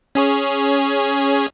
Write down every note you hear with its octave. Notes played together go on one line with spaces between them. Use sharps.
C#4 G#4 C#5